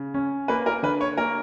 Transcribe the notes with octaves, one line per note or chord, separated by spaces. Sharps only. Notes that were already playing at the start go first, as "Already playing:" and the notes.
Already playing: C#3
C#4
A#3 B4
A#4
D3 B4
C#5
A#3 A#4